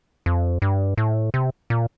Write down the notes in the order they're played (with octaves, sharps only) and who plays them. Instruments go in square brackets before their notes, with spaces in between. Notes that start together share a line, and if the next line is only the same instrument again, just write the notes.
[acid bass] F2
G2
A2
C3
A#2